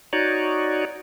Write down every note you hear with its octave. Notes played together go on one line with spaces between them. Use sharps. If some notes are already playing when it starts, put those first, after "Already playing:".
D#4 F#4 C#5 D5